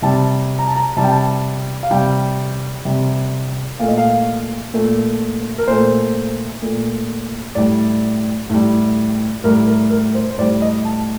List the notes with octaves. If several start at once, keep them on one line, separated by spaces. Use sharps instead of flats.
C3 G3 A5
A#5
A5
A#5
C3 G3 A5
G5
A5
F5
C3 G3 G5
C3 G3
A#2 A3 F5
D#5
F5
A#2 A3
A#4
A#2 A3 C5
A#2 A3
A2 G3 D5
A2 G3
A2 G3 A#4
A#4
A#4
C5
C5
A2 G3 D5
D#5
A5